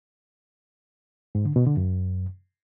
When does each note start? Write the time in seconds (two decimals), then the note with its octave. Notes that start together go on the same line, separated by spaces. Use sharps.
1.35 G#2
1.45 D3
1.56 B2
1.66 D3
1.77 F#2